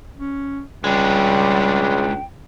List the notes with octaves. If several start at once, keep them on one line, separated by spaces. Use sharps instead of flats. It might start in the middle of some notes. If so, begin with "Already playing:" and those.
C#4
C#2 G3 G#3 D4 G5